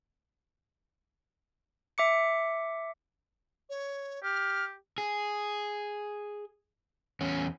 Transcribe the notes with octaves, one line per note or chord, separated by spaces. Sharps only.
E5 D6 C#7
C#5
G4 F6
G#4
E2 C#4